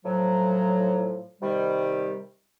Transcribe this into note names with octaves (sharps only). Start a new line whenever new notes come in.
A2 F3 F#3
C3 D#3 G3